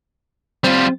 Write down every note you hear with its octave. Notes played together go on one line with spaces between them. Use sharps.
G3 C4 F4